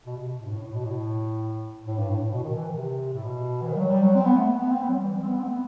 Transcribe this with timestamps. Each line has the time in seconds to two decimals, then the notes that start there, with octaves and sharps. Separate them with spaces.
0.06 B2
0.17 C3
0.29 B2
0.40 A2
0.46 G2
0.51 A2
0.63 A2
0.74 B2
0.85 A2
1.87 A2
1.98 G2
2.10 A2
2.22 A2
2.33 B2
2.44 D#3
2.55 E3
2.67 D#3
2.78 C3
3.14 A2
3.24 B2
3.62 E3
3.69 D#3
3.76 G3
3.80 F#3
3.91 G3
4.03 F#3
4.15 C4
4.25 B3
4.37 A3
4.48 B3
4.60 B3
4.70 C4
4.82 B3
4.89 F#3
4.93 G3
5.05 E3
5.16 G3
5.23 C4
5.28 B3
5.39 C4
5.45 A3
5.50 B3